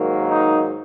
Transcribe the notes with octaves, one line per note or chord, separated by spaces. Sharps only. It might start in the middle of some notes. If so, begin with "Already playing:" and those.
Already playing: G#2 D#3 F#3 A#3
D#4